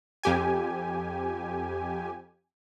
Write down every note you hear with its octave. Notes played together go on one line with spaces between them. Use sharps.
F2 G4 G#5